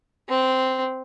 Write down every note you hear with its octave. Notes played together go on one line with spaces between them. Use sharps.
C4